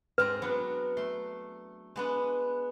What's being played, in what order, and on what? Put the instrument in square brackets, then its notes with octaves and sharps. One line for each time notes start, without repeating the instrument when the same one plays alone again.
[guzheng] G#2 C4 A#5 [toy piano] B4
[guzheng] F#3 B3 D4
A3 C6
G#3 B3 D4